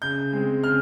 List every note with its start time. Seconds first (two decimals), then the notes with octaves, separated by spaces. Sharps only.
0.02 C#3 G6
0.32 G#3 C4
0.63 C#3 F6